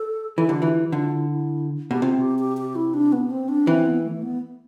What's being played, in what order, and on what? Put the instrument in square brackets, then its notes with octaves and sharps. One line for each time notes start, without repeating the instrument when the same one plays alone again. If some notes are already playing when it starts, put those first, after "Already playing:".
Already playing: [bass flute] A4
[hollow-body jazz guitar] E3 [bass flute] A4
[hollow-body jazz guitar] D3 [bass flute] G4
[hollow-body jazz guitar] E3 [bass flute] F4
[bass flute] G4
E4
[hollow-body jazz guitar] D3 [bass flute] F4
[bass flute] E4
E4
[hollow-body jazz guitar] B2 [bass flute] G4
[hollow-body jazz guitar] C3 [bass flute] F4
[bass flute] G4
G4
G4
E4
D4
B3
C4
D4
[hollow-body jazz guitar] E3 [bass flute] C4
[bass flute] B3
A3
B3